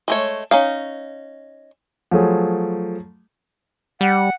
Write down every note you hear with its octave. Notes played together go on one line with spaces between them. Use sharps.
G#3 A3 C#5
C#4 D#4 F5
F3 F#3 A3 G#4
G3 F#5